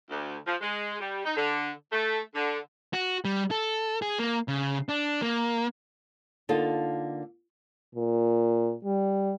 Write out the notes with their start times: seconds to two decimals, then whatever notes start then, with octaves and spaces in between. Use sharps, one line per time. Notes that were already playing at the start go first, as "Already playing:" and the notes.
0.10 D2
0.47 F3
0.61 G#3
1.00 G3
1.25 D#4
1.37 D3
1.93 A3
2.35 D3
2.94 F#4
3.25 G3
3.51 A4
4.02 G#4
4.19 A#3
4.48 C#3
4.89 D4
5.22 A#3
6.49 D3 A#3 D#4 F4 A4
7.95 A#2
8.84 G3